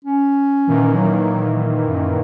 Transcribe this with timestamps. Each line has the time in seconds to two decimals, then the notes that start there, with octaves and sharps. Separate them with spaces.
0.05 C#4
0.67 A#2 D#3 E3
0.94 F#3
1.80 F#2